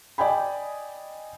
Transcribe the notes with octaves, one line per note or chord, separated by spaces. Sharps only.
D5 D#5 G5 G#5 B5